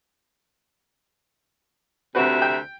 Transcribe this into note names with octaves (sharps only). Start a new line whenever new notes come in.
D2 C3 C4 F#4 B4 E5
G5